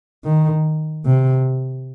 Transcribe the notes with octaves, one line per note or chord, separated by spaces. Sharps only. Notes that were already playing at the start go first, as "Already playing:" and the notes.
D#3
C3